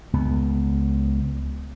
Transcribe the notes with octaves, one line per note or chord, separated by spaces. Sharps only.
C#2 B3